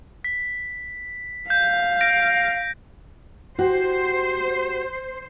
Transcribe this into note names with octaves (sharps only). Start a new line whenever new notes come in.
B6
F5 G6
A#6 D7
F#4 G4 C5